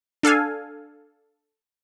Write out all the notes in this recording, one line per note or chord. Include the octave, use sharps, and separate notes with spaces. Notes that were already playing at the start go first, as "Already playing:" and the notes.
D4 A4 F5 G#5